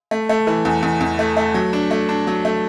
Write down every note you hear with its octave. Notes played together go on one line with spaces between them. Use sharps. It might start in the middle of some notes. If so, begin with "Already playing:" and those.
A3
A3
E3
E2
E2
E2
A3
A3
F#3
D4
A3
D4
F#3
A3